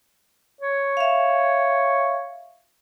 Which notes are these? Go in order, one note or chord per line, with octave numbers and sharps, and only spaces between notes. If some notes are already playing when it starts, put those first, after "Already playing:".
C#5
E5 F5